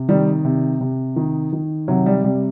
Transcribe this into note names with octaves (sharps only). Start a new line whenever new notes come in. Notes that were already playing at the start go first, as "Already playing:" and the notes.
Already playing: C3
D#3 G3
C3
C3
D#3
D#3
C3 F#3
G3
C3 G3